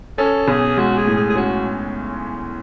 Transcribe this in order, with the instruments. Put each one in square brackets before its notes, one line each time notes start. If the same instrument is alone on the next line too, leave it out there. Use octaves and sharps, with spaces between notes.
[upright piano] C#4 [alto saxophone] A4
[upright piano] B1 [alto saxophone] G#4
[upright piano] G#3 [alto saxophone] F#4
[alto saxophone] G#4
[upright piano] A2
[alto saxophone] G#4
G#4
[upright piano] C#4 [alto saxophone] F#4